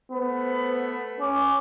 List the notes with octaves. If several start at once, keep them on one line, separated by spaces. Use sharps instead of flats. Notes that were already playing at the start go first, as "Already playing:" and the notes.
A3 B3 C5 B5
B4
C#4 D6